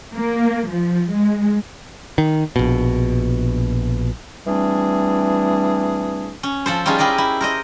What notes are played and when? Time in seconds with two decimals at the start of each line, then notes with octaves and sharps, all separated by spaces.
0.14 A#3
0.69 F3
1.12 G#3
2.18 D#3
2.56 A#1 B2
4.47 E3 G3 A3 C4 D4 G#4
6.43 C#4
6.66 F3 A4 C5
6.86 G3 C#4 D#4 F4 G#4
6.98 E4 G4 G#4 A#4 D#5
7.18 E4
7.41 A#4 C5 D#5